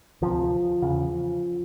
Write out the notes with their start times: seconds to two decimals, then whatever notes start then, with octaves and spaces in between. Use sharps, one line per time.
0.22 D2 C3 F3
0.82 E2 C#3